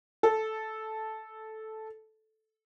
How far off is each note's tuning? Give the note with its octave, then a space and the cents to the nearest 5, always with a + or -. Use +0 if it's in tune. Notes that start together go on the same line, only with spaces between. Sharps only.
A4 -10